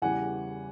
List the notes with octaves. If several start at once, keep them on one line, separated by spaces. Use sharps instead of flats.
E2 C#3 E3 G3 F#5 G#5